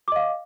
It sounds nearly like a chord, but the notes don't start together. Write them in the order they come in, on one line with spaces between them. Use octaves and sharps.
D6 D#5 F5